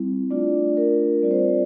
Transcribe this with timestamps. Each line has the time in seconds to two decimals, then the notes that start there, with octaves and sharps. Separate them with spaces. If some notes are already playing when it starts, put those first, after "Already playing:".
Already playing: G3 C4 E4
0.30 A3 D4 F4 D5
0.77 A#4
1.22 G3 C4 F4 D5
1.31 C5
1.39 D5